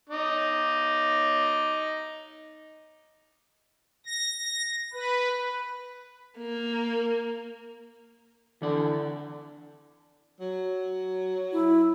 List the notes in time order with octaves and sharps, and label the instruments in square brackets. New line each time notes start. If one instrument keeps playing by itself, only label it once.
[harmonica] D#4 D6
[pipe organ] A#6
B4
[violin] A#3
[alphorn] D3 [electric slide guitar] E3 D5
[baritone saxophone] F#3
[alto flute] E4